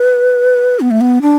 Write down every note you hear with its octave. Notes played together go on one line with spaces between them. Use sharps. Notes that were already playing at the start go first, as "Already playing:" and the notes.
Already playing: B4
B3
A3
B3
D4